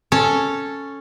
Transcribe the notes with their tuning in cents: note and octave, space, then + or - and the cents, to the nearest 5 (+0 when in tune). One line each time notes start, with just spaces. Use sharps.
C#4 +0 A4 +0